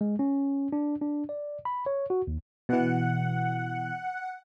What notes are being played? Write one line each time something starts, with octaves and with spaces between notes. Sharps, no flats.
G#3
C#4
D4
D4
D5
B5
C#5
F#4
D#2
B2 E3 F#5